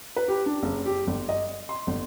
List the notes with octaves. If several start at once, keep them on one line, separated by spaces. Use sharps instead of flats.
B4
G4
D4
F#1
G4
G1
D#5
C6
G1